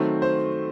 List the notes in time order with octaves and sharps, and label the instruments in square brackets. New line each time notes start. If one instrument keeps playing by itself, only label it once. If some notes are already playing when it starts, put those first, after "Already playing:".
Already playing: [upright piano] D#3 F#3 A3 C4
C5